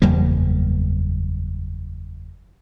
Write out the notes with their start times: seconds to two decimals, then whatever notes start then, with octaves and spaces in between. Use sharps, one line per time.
0.02 F#1 E2 G3 A#3